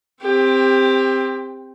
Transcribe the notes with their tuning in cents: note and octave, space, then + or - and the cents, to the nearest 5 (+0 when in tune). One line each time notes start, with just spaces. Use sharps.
C4 +0 G4 +25